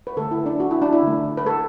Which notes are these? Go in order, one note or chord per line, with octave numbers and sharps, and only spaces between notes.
B4
D3 A3 A4
E4
D4
F#4
E4
D4
E4
D3 A3
B4
A4